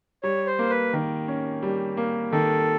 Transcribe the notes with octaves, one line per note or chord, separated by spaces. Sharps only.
G3 C#5
C5
A#3
B4
D#3
C#4
G3
A#3
D#3 A4